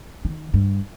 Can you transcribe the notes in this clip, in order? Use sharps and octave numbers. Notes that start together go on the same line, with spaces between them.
D#3
G2